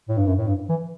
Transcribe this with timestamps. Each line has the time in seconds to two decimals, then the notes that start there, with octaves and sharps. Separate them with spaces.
0.09 A2
0.18 G2
0.27 F#2
0.38 A2
0.48 G2
0.69 E3